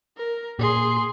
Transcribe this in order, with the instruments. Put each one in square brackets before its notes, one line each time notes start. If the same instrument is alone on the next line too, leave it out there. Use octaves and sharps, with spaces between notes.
[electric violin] A#4
[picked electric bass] A#2 [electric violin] G#4 C6